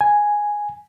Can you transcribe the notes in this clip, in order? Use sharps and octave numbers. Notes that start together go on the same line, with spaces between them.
G#5